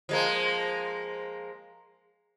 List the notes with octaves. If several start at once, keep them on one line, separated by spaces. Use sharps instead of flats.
F3 G#3 A#3